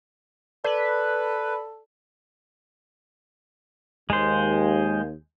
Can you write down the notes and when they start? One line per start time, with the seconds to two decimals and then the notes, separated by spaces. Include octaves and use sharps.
0.65 A4 B4 D5
4.10 D#2 G#3 C5